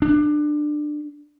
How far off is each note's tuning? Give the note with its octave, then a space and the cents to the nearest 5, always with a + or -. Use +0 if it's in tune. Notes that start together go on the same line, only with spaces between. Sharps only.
D4 +20